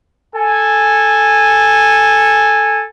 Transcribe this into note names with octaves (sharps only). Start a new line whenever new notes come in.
A4 G#5